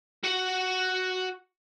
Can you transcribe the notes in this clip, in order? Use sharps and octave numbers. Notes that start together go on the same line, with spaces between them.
F#4 F#5